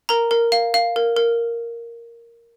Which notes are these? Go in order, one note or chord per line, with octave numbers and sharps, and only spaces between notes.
A#4 A#5
A#4
F5
F5
A#4
A#4